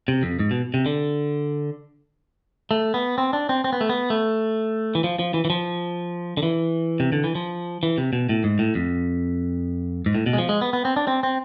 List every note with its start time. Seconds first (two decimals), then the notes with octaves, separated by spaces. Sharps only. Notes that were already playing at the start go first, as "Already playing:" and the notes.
0.08 C3
0.23 F2
0.39 G#2
0.51 B2
0.74 C3
0.86 D3
2.71 A3
2.94 B3
3.18 C4
3.33 D4
3.49 C4
3.64 C4
3.73 B3
3.81 A3
3.89 B3
4.10 A3
4.95 E3
5.04 F3
5.19 F3
5.34 E3
5.45 E3
5.50 F3
6.37 D3
6.43 E3
7.00 C3
7.12 D3
7.24 E3
7.35 F3
7.83 E3
7.98 C3
8.13 B2
8.29 A2
8.44 G#2
8.59 A2
8.75 F2
10.06 G#2
10.15 A2
10.26 B2
10.33 G#3
10.38 F3
10.49 G#3
10.61 B3
10.73 B3
10.85 C4
10.96 D4
11.07 C4
11.23 C4